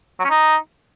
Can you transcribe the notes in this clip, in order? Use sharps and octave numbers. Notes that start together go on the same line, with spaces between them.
F#3
C#4
D#4